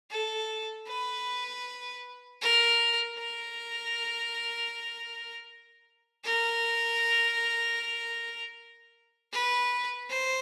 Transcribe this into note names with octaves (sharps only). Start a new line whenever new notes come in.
A4
B4
A#4
A#4
A#4
B4
C5